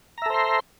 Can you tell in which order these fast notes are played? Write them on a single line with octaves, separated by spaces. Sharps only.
A#5 E5 A4 C5 C6